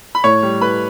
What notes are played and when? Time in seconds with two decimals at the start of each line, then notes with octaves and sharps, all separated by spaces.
0.15 B5
0.24 A2 C#5 C#6
0.43 G3
0.61 A2 B4 B5